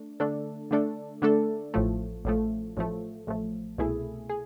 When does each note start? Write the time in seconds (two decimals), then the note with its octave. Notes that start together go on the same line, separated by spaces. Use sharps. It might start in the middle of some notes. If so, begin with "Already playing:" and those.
Already playing: A3 D4
0.20 D3 A3 D4 A4
0.71 D3 A3 D4 A4
1.22 D3 A3 D4 A4
1.74 A1 A2 F3 A3
2.25 A1 A2 F3 A3
2.77 A1 A2 F3 A3
3.27 A1 A2 F3 A3
3.78 C2 B2 A3 E4 G#4
4.30 G#4